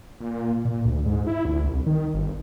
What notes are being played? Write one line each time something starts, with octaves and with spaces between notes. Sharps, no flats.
A#2
A#2
D2
G#2
E4
D2
C2
D#3
G1